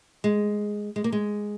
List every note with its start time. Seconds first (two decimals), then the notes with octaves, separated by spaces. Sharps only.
0.24 G#3
0.96 G#3
1.04 A#3
1.12 G#3